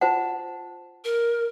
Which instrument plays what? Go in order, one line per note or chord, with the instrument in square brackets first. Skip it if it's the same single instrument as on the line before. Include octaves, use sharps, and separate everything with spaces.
[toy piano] F4 C5 F#5 [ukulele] A5
[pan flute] A#4